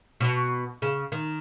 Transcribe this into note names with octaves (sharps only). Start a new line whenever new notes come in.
B2
C#3
D#3